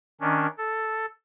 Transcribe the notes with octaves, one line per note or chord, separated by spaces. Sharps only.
D#3 C#4 D4
A4